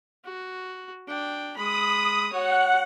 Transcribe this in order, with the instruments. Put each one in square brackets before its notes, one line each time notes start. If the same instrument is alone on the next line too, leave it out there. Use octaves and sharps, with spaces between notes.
[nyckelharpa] F#4
D4 G5
[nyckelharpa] G#3 B5 [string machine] D#6
[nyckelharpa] F#4 C#5 [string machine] F#5